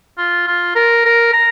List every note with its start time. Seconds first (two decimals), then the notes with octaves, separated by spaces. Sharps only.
0.18 F4
0.48 F4
0.75 A#4
1.05 A#4
1.33 A#5